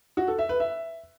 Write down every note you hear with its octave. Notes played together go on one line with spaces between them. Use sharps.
F#4
A4
E5
B4
E5